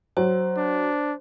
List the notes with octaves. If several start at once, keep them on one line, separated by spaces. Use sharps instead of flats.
F#3 C5
D4